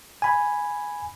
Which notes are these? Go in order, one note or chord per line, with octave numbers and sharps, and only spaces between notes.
G#5 B5